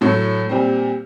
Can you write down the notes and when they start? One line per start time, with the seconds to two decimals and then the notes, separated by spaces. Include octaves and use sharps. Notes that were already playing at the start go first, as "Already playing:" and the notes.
0.01 A2 F#3 A3
0.49 A#2 G3 C4